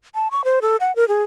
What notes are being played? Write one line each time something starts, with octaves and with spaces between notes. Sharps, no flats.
A5
C#6
C5
A4
F#5
A#4
G#4